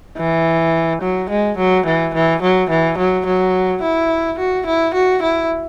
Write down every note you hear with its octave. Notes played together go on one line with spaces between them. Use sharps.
E3
F#3
G#3
F#3
E3
E3
F#3
E3
F#3
F#3
E4
F#4
E4
F#4
E4